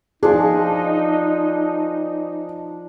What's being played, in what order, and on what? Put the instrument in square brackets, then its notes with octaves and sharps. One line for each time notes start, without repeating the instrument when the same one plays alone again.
[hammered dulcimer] F3 D4 [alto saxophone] D#4 [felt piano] G#4